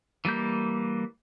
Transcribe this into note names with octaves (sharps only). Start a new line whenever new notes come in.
E3 G3 A#3 G6